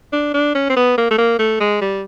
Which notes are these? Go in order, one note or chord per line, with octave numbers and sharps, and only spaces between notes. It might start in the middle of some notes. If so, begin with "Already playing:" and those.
D4
D4
C#4
C4
B3
A#3
A3
A#3
A3
G#3
G3